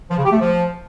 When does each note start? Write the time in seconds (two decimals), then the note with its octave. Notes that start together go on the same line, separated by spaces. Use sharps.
0.10 F3
0.18 C#3
0.25 G4
0.32 A3
0.39 F3